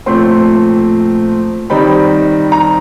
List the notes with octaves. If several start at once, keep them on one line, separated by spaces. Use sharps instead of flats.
A#2 F3 A3 C4 C6
D#3 G3 C4 D#4 B5
A#5